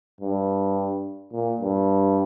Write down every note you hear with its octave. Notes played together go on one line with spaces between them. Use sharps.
G2
A#2
G2